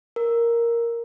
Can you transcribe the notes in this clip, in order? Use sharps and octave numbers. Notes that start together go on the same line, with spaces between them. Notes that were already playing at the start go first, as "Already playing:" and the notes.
A#4